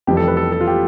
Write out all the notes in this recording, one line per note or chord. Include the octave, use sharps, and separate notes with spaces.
F1 F2 E3 G3 G4
A4
B4
A4
A4
F4
G4